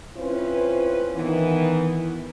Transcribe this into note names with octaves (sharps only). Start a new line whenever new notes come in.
C4 C#4 E4 F4 B4 C5
D#3 E3 B3